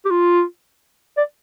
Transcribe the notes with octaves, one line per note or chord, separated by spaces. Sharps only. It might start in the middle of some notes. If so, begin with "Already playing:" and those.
G4
F4
D5